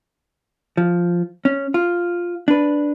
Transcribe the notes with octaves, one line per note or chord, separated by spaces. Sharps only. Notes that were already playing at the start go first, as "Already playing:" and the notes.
F3
C#4
F4
D4 B4